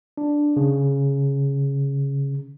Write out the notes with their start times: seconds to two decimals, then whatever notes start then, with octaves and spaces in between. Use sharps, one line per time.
0.17 D4
0.56 C#3